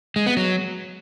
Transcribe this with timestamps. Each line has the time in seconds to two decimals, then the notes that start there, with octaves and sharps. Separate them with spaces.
0.16 G#3
0.26 B3
0.37 F#3